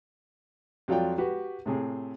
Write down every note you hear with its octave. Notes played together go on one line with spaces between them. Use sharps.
F2 F#3 F4 D5 G5
F#4 G4 B4
A2 C3 G#4